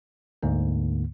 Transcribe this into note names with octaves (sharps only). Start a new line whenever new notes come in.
D2 G#2 D3 A#3